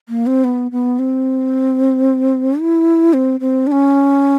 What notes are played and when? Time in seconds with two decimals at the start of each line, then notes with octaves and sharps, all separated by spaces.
0.09 A#3
0.27 C4
0.44 B3
0.72 B3
0.99 C4
2.60 E4
3.13 C4
3.40 C4
3.67 D4
3.72 C#4